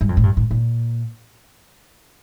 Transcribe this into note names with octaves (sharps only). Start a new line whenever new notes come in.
G2
F2
A2
G2
A2
A#2